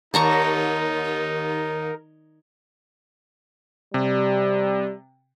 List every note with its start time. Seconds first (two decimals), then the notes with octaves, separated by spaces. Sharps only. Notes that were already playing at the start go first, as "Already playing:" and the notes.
0.14 D#2 D#4 A#4 A5 A#5 C#6
3.94 C3 G3